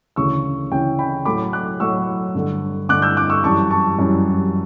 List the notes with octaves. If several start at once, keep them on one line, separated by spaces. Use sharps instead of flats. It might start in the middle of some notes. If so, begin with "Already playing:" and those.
D2 C#3 E3 C#6 E6
D2 C#3 E3 G5
G5 B5
A2 F#3 A3 B5 D6
D6 F#6
A2 F#3 A3 C#6 E6
G2 D3 A3
G2 D3 A3 D6 F#6
E6 G6
D6 F#6
C#6 E6
F#2 E3 G3 A5 C#6
A5 C#6
F#2 E3 G3